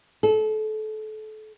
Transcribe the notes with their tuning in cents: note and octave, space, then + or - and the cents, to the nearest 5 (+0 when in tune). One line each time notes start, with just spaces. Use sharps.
A4 -30